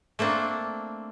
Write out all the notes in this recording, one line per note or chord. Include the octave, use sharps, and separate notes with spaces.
A3 A#3 C4 D4